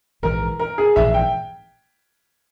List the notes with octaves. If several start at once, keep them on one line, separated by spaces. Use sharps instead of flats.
A#1 G#2 E3 A#4
A#4
G#4
A#1 G#2 E3 E5
G5